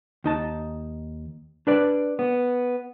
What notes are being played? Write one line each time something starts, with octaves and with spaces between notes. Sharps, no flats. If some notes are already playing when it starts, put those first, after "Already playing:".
D#2 D#4 A5
D4 B4 D5
B3